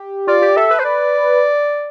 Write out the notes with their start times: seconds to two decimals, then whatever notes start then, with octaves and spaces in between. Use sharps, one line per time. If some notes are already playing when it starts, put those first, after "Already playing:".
Already playing: G4
0.27 F4 D5
0.42 G4
0.57 A4 E5
0.71 B4
0.79 C5
0.85 D5